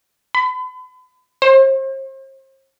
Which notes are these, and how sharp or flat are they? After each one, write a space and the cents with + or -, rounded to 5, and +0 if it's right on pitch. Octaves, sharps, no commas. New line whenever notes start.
B5 +40
C5 +40